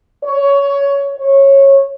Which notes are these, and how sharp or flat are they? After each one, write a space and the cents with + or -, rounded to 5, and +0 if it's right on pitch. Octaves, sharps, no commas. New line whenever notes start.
C#5 +15
C#5 -15